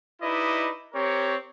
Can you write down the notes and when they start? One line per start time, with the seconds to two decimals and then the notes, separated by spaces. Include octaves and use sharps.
0.21 D#4 E4 G4 B4 D5 D#5
0.94 C4 G4 A#4 C#5